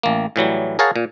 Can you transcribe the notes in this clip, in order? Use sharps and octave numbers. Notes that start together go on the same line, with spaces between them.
A1 A#3
A2 E3 F#3 G3
G#4 A#4 C#5 F5 F#5 A5
A#2